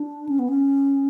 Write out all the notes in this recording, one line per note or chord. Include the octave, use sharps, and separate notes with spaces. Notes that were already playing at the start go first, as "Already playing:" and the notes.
Already playing: D4
C#4
B3
C#4